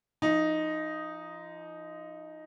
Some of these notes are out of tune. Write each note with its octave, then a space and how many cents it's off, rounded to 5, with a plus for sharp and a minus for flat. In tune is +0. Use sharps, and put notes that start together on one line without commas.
F3 -35 D#4 +0